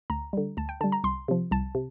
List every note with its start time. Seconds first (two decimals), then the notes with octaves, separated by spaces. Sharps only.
0.10 D2 A#5
0.33 D3 G3
0.57 D2 A5
0.69 G5
0.81 D3 G3 A5
0.92 A#5
1.04 C2 C6
1.28 C3 F3
1.51 C2 A5
1.75 C3